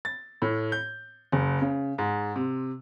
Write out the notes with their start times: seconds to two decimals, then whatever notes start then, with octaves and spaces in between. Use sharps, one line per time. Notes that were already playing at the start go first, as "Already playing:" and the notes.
0.05 A6
0.42 A2
0.72 G6
1.32 F#1
1.61 C#3
1.98 G#2
2.36 C3